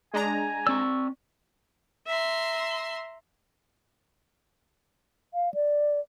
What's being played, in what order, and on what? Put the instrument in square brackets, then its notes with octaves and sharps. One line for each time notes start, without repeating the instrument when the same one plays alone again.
[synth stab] G#3 D4 A#5 [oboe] G#5
[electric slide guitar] C4 D5 [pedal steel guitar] C#6 E6
[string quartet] E5 A#5 C6
[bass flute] F5
D5